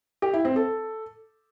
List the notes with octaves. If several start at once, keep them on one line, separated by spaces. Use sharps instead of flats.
G4
E4
C4
A4